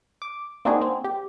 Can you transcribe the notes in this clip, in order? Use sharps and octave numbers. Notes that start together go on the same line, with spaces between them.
D6
A#3 C4 D4 D#4 F#4 G#4
C4
G4